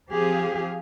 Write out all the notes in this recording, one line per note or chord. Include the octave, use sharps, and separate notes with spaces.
F3 C4 G4 G#4 F5